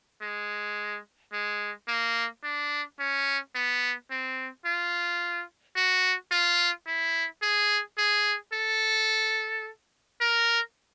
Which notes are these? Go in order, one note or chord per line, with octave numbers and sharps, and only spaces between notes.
G#3
G#3
A#3
D4
C#4
B3
C4
F4
F#4
F4
E4
G#4
G#4
A4
A#4